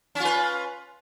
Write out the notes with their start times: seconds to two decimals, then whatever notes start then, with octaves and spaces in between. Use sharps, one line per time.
0.15 C#4
0.20 F4
0.25 B4